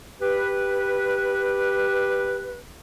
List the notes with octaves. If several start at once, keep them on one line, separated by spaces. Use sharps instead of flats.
G4 B4